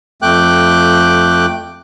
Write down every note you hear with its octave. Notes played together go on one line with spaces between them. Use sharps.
F2 A3 G5 D6 F#6